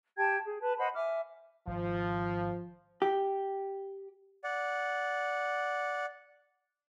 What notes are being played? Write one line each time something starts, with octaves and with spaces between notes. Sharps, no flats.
G4 G5 A5 G#6
G#4
B4 A5
C5 D#5 F#5 B5
E5 G#5 D6 F6
G#1 F3
G4
D5 F#5